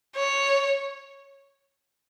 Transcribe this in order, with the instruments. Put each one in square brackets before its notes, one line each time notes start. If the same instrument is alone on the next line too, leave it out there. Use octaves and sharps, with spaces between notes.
[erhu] C#5